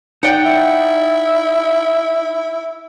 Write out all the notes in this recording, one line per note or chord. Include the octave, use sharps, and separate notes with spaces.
D#4 D5 F#5 G5
E4